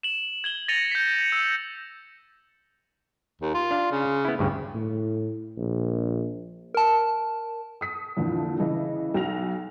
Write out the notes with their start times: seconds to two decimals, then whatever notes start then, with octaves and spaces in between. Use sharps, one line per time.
0.03 E7 F#7
0.44 G#6 F#7 G7
0.68 A6 A#6 C#7 D#7 F7 G7
0.92 G6 B6
1.14 C#7
1.32 E6
3.41 D#2
3.54 F4
3.71 D4 F5
3.91 C#3
4.25 B3 E4
4.39 D2 G2 C#3
4.75 A2
5.57 A#1
6.74 A#4 A5
7.81 D#6 B6
8.17 F2 A#2 D3 E3
8.59 C#3 E3 D#5
9.14 B1 F#3 A#6 F7